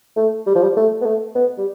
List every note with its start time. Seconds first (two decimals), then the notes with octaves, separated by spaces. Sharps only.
0.17 A3
0.46 G3
0.55 F3
0.63 G3
0.76 A3
1.01 B3
1.05 A3
1.35 B3
1.58 G3